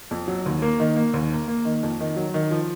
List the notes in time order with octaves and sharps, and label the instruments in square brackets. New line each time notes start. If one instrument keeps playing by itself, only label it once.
[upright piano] F2
F#3
D#2
A#3
D#3
A#3
D#2
A#3
A#3
D#3
F2
D#3
F#3
D#3
F3